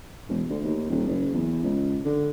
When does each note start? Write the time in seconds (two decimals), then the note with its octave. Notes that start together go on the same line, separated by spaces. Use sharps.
0.29 E1
0.49 D2
0.64 D#2
0.89 D#1
1.07 F#1
1.33 E2
1.63 C#2
2.05 D3